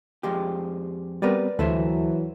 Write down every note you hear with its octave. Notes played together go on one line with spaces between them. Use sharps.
F2 G#3 G4
G3 B3 C4 A#4 B4 D5
D2 E3 F#3 A4 B4 C5 E5